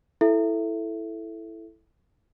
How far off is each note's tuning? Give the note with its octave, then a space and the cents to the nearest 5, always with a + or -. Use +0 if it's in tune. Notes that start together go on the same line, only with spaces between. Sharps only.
E4 +0 A4 +0 E5 +15